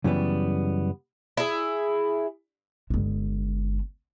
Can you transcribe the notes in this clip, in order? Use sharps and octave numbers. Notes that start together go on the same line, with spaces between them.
F#2 C#3 E3 G3 B3
E4 G#4
G1 G#3